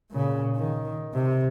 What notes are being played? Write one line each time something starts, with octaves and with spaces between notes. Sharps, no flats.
A#2 C#3
D#3
C3